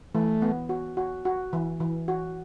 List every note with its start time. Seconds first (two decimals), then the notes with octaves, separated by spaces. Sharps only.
0.14 E3 A3
0.42 B3
0.69 F#4
0.97 F#4
1.25 F#4
1.53 E3
1.80 E3
2.08 F#4